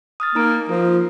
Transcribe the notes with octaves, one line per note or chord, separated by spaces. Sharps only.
D#6 F6 A6
A#3 D#4 A#5 D7
F3 F4 A#4